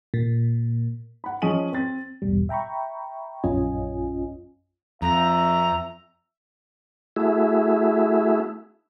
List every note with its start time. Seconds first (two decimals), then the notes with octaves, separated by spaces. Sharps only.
0.14 A#2
1.24 F#5 B5
1.42 F3 C#4 G#4 D#5 D#7 F#7
1.72 C4 A6
2.22 A#1 E2 G#2 B2 G3
2.49 E5 G5 A#5 B5 C#6
3.44 A#1 F#2 C#4 F4 D#5 G#5
5.02 F2 E5 A#5
7.16 A3 E4 F#4 G#4 E5